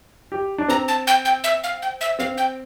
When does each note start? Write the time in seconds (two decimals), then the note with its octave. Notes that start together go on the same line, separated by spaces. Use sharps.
0.32 G4
0.58 D4
0.68 C4 A#5
0.88 A5
1.07 G5
1.25 G5
1.44 E5
1.64 F5
1.82 G5
2.01 E5
2.19 C4 F5
2.37 G5